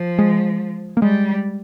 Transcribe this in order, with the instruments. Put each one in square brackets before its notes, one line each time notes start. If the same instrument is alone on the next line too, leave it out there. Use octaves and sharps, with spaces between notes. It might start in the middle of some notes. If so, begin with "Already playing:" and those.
Already playing: [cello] F3
[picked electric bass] G#3
A#3
[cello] G3 [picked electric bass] G#3